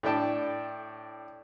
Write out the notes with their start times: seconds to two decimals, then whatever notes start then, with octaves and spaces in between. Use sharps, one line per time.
0.03 A2 D4 G5 A5